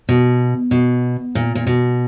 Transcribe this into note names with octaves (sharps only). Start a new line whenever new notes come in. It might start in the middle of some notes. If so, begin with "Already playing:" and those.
B2
B2
A#2
A#2
B2